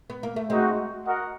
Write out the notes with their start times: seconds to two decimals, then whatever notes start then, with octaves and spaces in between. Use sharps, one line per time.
0.10 B3
0.23 A#3
0.36 A3
0.49 G#3 C4 D#4 F#4
1.07 F#4 A#4 D#5 F#5